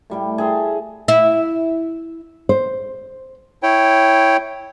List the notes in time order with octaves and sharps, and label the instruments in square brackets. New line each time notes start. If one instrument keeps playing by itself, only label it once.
[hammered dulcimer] A2 G3 G5
G#4 E5 A5 C6
[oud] E4
[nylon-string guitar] C5
[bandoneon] E4 C#5 G5